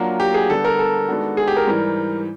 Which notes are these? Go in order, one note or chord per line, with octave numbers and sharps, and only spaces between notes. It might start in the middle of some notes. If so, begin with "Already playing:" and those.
Already playing: F#3 A#3 D4 F4 F#4
G4
G#4
D3 G3 B3 D4 A4
A#4
A4
D#3 G#3 B3 D4 F#4
G#4
G4
A#4
G#2 E3 G3